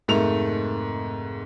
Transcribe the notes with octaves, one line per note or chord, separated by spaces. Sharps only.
F1 G#2 A3 A#3 F7